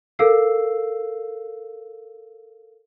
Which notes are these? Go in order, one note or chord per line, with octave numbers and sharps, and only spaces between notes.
A4 A#4 F5 E6 C7